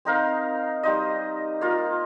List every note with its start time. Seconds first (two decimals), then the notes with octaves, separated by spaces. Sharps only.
0.05 C4 D#4 A#4 F5
0.83 G3 D#4 C5 D#5
1.61 A#3 F4 A#4